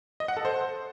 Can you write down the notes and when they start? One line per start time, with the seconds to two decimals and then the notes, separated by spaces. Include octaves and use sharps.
0.20 D#5
0.28 F#5
0.37 A4
0.45 C5